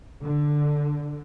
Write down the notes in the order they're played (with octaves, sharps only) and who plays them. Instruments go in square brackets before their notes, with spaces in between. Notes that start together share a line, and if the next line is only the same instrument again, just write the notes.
[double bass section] D3